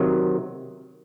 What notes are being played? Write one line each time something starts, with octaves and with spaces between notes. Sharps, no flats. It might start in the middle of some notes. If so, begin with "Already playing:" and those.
Already playing: C3 D#3 F#3